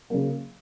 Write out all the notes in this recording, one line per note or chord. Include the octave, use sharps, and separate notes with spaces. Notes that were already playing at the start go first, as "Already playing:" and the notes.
C#3 F#3 A#3